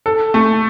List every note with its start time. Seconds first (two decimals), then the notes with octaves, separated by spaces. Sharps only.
0.06 A4
0.34 A3